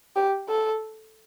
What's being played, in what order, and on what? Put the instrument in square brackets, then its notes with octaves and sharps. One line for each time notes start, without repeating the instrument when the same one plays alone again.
[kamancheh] G4
A4